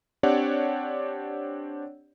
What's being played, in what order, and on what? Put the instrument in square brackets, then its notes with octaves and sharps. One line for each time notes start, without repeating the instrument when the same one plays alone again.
[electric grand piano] C4 D4 G4 C#5 D5 F#5